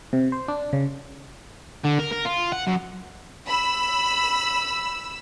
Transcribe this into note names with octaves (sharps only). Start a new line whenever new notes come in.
C3
C5
D4
C#3
D3
A#4
A#4
F4
F#5
F#2
B5 E6